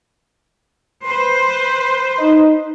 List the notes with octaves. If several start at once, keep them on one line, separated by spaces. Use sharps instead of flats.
B4 C5
D#4